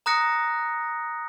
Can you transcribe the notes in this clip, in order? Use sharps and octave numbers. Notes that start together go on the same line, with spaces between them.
A#5 D#6 F#6 A#6 C#7